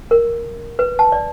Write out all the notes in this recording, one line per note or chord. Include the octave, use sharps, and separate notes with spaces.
A#4
B4
A5
D5